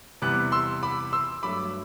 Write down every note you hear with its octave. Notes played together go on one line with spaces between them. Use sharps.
E2 C3 G3 B3 D6 F#6
C6 E6
B5 D6
C6 E6
G2 F#3 A3 B5 D6